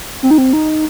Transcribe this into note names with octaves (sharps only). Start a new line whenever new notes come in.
C4
D#4
C4
D#4